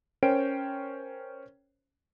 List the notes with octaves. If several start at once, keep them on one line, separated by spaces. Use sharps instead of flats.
C#4 A#4 C5 C#5 G5 D7